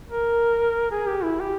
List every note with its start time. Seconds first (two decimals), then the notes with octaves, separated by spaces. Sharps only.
0.09 A#4
0.91 G#4
1.07 G4
1.23 E4
1.40 G4